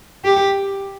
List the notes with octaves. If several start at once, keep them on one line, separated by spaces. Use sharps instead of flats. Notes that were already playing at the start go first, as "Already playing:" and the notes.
G4